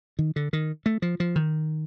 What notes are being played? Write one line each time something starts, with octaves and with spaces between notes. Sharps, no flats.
D#3
D3
D#3
A3
F3
F3
D#3